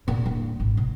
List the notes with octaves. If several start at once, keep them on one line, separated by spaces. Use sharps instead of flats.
A#2
D1
G#1
B2